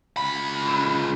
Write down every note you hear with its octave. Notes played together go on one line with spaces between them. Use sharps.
C#2 B5